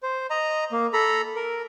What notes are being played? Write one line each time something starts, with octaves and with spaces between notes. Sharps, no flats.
C5
D#5 A#5
A#3
A4 A#5 B5
A#4